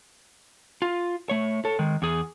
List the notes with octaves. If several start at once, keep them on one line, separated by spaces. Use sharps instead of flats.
F4
A3 C#5
A4 C#5
D#3 G#3
E2 G#4